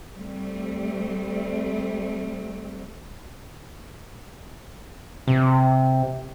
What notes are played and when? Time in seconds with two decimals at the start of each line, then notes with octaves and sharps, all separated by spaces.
0.14 G3 A3 C4
5.28 C3